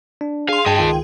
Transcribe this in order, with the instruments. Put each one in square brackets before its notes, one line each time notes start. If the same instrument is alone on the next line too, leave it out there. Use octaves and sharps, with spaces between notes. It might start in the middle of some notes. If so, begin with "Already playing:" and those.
[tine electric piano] D4
[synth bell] G#4 C6 [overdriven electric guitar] F5
[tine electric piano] G2 [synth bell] G#4 G5 [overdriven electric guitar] D#5 A5
[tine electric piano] C#2 D#3 F4